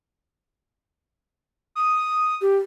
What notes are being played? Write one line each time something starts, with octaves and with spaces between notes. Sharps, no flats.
D#6
G4